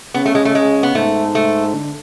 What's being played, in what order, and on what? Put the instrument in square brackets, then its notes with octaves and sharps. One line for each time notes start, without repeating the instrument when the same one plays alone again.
[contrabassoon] C#3 [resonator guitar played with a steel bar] B3
[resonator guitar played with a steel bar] A3
G#3
A3
G#3
B3
[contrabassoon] G#2 [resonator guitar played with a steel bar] A3
[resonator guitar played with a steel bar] A3
[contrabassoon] D3